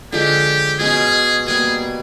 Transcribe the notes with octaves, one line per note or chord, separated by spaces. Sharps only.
D3 F3 G#3 G4
B2 G#3 C#4 G#4
B2 G3 A#3 G#4